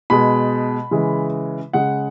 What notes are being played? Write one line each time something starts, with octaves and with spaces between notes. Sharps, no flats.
B2 G#3 B5
C#3 E3 G#3
C#3 G#3 F#5